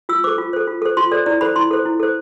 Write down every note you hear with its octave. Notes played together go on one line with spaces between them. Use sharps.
F4 E6
A4 C5 D6
F4
A4 C5
F4
A4 C5
F4 C6
A4 C5 D5
E4 D5
A4 C5 B5
E4 C6
A4 C5
E4
A4 C5